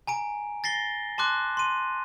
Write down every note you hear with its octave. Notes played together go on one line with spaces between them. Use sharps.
G#5 A#5 D7
A6 A#6 C7 G7
A5 C6 D6 F#6
C6 D#7